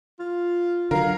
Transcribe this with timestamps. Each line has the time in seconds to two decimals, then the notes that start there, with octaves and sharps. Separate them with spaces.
0.19 F4
0.91 D3 F#3 A#4 F5